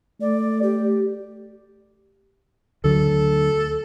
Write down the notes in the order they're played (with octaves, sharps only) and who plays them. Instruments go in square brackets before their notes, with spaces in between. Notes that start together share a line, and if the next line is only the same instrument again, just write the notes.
[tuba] A3 [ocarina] D5
[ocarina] G4
[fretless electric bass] D2 D3 F#3 [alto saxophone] A4